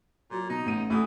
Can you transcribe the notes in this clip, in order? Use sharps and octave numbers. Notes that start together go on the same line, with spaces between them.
A#2 F#3
B2 D#4
A1 D#7
D2 E3 A3 D#6